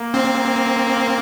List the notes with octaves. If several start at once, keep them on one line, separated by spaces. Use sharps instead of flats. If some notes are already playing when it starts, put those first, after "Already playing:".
Already playing: A#3
C4
A#3